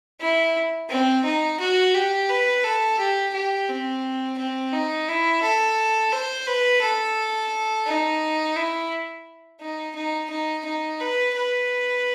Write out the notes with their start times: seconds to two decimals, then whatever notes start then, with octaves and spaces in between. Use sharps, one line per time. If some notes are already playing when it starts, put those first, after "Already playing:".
0.21 E4
0.89 C4
1.25 D#4
1.60 F#4
1.94 G4
2.29 B4
2.64 A4
2.99 G4
3.34 G4
3.69 C4
4.38 C4
4.73 D#4
5.08 E4
5.43 A4
6.12 C5
6.47 B4
6.82 A4
7.86 D#4
8.56 E4
9.60 D#4
9.95 D#4
10.30 D#4
10.65 D#4
11.00 B4
11.35 B4